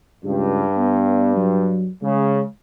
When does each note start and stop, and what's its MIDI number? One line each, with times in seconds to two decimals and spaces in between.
0.24 0.63 37
0.24 1.91 43
0.77 1.36 59
1.37 1.90 54
2.02 2.41 49
2.02 2.46 56